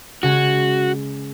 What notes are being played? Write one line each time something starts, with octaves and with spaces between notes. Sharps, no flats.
C#3 G#3 F#4 G#5